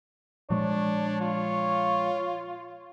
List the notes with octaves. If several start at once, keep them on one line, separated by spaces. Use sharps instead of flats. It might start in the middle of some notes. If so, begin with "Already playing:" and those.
A#2 F3 G#3 D4 C#5
F4